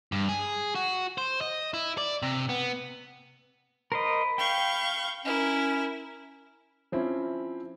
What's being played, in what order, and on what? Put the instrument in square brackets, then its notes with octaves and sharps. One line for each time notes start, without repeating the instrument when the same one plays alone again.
[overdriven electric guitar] G2
G#4
F#4
C5
D#5
E4
D5
C3
B3
[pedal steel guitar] A#4 C5 D#5 [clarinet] B5
[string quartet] F5 C#6 G6 [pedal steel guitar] G5
[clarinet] C#4 [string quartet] E4 A#4
[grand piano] F3 C4 C#4 E4